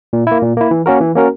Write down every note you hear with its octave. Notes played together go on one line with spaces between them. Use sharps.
A#2
A#3 E4
A#2
A#3 E4
E3
A#3 C#4 F#4 A#4
E3
A#3 C#4 F#4 A#4